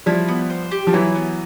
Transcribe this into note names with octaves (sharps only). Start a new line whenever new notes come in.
F3 G3 E4
B3
C5
G4
F3
E3 F#3 E4
B3